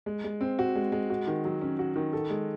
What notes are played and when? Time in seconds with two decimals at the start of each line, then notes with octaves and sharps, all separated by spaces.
0.06 G#3
0.24 G#3
0.41 C4
0.59 F#4
0.75 G#3
0.92 G#3
1.10 F#4
1.27 D#3
1.45 F#3
1.61 C#4
1.79 F#4
1.96 D#3
2.13 A4
2.30 G#3